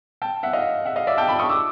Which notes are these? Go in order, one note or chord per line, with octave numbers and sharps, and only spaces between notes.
G5 A5
E5 F#5
D#5 F5
E5 F#5
D#5 F5
D5 E5
G5 A5
A5 B5
C#6 D#6
D6 E6